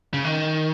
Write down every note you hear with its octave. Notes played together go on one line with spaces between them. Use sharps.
C#3
D#3